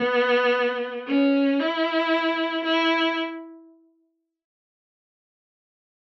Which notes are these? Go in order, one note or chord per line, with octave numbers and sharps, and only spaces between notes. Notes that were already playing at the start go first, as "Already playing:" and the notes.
Already playing: B3
C#4
E4
E4